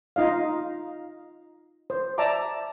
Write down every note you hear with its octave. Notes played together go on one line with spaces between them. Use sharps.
D#4 F4 D#5 F5
C5
D5 E5 A5 A#5 D6